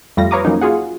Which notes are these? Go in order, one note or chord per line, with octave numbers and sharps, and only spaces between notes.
F2 G3 A3 F4 A#6
B4 C#5 F5 A#5 D6 D#6
F3 F#3 A#3 C#4 D#4
F4 F#4 G#4 F#5